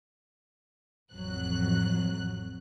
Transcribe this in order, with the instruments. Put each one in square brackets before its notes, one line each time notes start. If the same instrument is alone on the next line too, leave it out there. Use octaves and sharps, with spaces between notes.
[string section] A1 F2 F#3 F#6